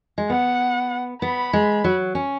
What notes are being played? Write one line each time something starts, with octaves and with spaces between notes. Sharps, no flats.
G#3
B3 F#5
B3 B5
G#3
F#3
C#4